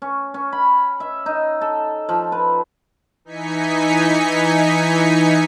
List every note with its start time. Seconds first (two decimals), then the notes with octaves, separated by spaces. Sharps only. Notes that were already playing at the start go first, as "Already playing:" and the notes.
0.02 C#4
0.34 C#4
0.53 B5
1.00 E5
1.26 D#4
1.61 A4
2.09 F3
2.32 B4
3.25 E3 D#4 G#5 B6 C#7